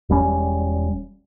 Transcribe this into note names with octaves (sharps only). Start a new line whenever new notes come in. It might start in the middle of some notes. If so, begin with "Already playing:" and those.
E1 G3 C#4